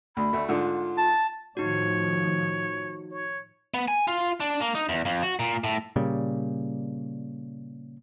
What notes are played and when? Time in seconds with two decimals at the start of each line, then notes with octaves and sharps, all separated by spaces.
0.17 D2 B5
0.33 D2 A3
0.48 G#2 D3 F4
0.98 A5
1.57 A2 D#3 F3 D#4 F#4 C#5
3.11 C#5
3.74 B3
3.88 G#5
4.08 F4
4.40 D4
4.61 A#3
4.75 D#4
4.89 E2
5.05 F2
5.23 F#4
5.39 A#2
5.64 A2
5.96 A#2 C#3 G3